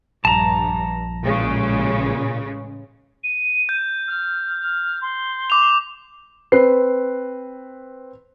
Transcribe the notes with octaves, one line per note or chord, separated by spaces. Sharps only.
A#1 G2 A5 A#5
A1 A#2 C#3 G#3
D#7
G6
F6
F6
C6
D6 F7
C4 B4 C7